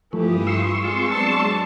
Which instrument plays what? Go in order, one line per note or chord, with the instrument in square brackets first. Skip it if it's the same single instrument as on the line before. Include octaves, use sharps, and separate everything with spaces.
[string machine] G2 F4 D#6 [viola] E3 G4 [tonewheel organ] F3 A3
[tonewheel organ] C6 C#6 E6
[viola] G#3 F4 [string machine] C4 G#4 B4
[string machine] F#3 G#3 B3 [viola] D4 A5